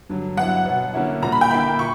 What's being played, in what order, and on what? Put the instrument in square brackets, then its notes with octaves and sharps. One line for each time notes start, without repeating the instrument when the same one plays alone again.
[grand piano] G2 D3 F#3
[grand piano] G2 F#3 B3 E4 [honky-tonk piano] F#5
[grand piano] B2 F#3 B3
D3 A#3 C#4 E4
[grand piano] A#2 G3 A#3 [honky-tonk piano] A#5
[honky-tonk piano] B5
G5
[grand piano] D3 A#3 E4 [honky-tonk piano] B5
[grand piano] A#2 [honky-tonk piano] C#6